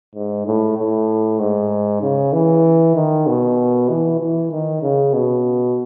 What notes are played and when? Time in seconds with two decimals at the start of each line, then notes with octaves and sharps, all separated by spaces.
0.15 G#2
0.46 A2
0.78 A2
1.40 G#2
2.02 C#3
2.33 E3
2.95 D#3
3.27 B2
3.89 E3
4.19 E3
4.51 D#3
4.82 C#3
5.13 B2